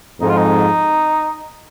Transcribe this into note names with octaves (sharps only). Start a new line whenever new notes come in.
F2 G#2 D#4
F4
D#4